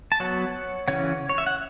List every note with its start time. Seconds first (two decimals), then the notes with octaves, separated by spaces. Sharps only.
0.12 A5
0.20 F#3 B3 C#5 F#5
0.88 C#3 E3 C#4 C#5 F#5
1.29 C#5
1.38 E5
1.47 F#5